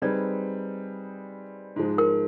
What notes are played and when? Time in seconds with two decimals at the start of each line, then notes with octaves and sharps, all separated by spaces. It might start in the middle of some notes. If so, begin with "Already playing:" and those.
0.02 G3 C4 D#4 G#4 B4 D5
1.76 G#2 F3 G#3
1.98 A#4